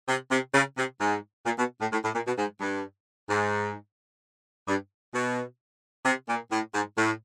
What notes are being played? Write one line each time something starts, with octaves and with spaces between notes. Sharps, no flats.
C3
C3
C#3
C3
G#2
A#2
B2
A2
A2
A2
A#2
B2
G#2
G2
G#2
G2
B2
C3
A#2
A2
G#2
A2